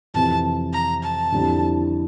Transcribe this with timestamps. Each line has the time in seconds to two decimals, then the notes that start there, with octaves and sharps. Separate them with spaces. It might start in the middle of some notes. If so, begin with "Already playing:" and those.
0.14 F2 C3 E3 A5
0.73 A#5
1.03 A5
1.32 F2 D3 G3 C4 E4